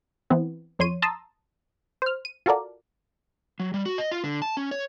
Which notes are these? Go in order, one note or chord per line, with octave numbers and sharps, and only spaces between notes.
E3 B3 C4
F2 C#5 C6 D#7
A5 A#5 C6 D#6 E6 A6
C5 F6
D#7
F4 F#4 A4 A#4 D5
F#3
G3
F#4
D#5
F4
D3
A5
C#4
C#5